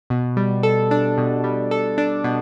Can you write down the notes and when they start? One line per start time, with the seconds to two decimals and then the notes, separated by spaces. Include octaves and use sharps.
0.10 B2
0.37 G3
0.63 A4
0.91 D4
1.18 B2
1.44 G3
1.71 A4
1.98 D4
2.24 B2